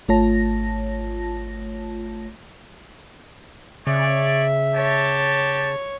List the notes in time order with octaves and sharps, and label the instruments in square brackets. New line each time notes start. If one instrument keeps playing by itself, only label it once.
[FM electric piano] G#1 A3 F4 C#5 A5 A#6
[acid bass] C#3 [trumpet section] C#5 D5 [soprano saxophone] E5
[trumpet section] G4 A5 [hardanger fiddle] C#5